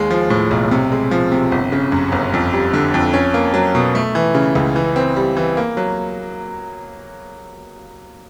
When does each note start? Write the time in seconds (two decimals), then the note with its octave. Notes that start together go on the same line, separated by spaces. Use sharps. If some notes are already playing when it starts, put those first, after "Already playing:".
Already playing: D#2 G#3
0.11 F3
0.30 A2
0.51 B1
0.71 C3
0.92 G#3
1.11 F3
1.32 C3
1.52 G1
1.72 C#3
1.92 F#2
2.12 G1
2.34 F2
2.53 G3
2.73 D3
2.94 F2
3.13 C#4
3.34 A#3
3.54 F#3
3.75 B2
3.95 A3
4.15 E3
4.35 C#3
4.55 C#2
4.76 E3
4.96 C4
5.16 G3
5.37 E3
5.57 A#3
5.77 F#3